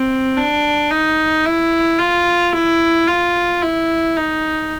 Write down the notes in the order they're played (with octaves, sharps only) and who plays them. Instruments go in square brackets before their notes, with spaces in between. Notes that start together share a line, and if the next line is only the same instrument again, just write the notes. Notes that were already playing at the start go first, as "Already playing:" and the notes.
Already playing: [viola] C4
D4
D#4
E4
F4
E4
F4
E4
D#4